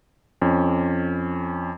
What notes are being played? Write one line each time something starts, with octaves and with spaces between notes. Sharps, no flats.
F2 C#4